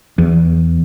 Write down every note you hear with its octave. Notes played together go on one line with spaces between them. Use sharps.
E2